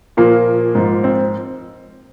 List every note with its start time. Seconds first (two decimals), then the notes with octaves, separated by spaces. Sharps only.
0.17 A#2 F3 A#3
0.75 G#2 F3
1.04 C4